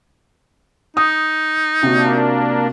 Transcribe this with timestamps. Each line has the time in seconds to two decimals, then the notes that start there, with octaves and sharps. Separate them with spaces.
0.97 D#4 D#6
1.83 C3 A#3 D4 F#4